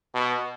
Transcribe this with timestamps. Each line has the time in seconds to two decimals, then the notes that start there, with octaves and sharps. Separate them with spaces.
0.15 B2